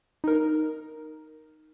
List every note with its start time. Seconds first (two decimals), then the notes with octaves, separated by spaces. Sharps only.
0.24 D#4 A#4